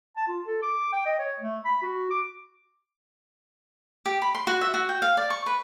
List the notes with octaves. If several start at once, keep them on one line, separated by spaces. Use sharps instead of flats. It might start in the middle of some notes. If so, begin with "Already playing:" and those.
A5
F4
A4
D6
G5
D#5
C#5
A3
B5
F#4
D6
G4
B5
C6
F#4
E5
F#4
G5
F5
D5
C#6
B4